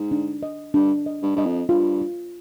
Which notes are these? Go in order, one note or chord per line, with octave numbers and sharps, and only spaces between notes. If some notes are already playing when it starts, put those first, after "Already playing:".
Already playing: G#2
D4
D#5
G2 D4
D#5
G2
G2 D#5
F2
G2 F4
F4